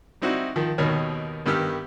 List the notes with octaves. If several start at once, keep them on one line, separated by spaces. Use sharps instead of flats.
G3 C4 D#4 E4 F#4
D#3 F3
D#2 B2 D#3 A#4 C#5
G2 D#3 B3 G4 E6 F6